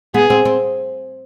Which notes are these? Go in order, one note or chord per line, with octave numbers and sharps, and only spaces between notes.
B3 G#4
C4
C4